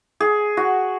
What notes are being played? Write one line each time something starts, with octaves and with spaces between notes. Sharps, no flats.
G#4
F#4